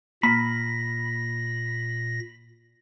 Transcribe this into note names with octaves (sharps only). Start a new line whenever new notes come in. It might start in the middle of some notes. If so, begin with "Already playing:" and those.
A#2 A#3 B5 A#6